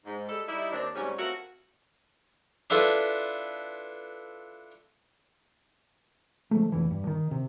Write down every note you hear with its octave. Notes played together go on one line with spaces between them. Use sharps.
G#2
G3 G#3 A4
G3 D#4 E4
D#2 C4 D4
G#2 C3 F#3 G3 C#4
A3 C4 F4 F#4 A#4 E5
D4 E4 F4 A4 B4
C#3 F3 G#3 A3
F1 E3
G2
D#3
C3